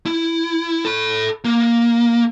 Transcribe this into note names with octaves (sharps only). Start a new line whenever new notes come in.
E4
A4 B5
A#3